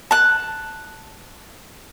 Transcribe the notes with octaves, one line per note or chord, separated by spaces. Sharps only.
A5 F#6